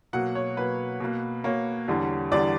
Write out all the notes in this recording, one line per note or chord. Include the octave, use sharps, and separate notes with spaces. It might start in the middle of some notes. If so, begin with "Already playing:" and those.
B2 F#3 A#3 F#5
C#5
B2 F#3 A#3 B4
B2 A#3
B2 A#3 C#5
E2 D3 G3
E2 D3 G3 D5